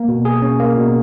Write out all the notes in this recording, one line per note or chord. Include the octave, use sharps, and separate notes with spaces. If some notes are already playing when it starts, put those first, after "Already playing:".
Already playing: A#3
B2
G#4
C#4
A#3
B2